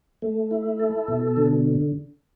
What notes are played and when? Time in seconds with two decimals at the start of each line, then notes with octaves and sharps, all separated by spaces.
0.22 A3
0.51 E4
0.80 A4
1.08 B2
1.37 D3